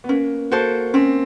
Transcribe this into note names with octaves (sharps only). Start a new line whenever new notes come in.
B3
A#3 C#4
A#3 F#4 A4 C5
C4 C#4